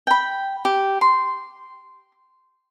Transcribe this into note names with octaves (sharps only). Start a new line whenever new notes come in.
G5 B5
G4
C6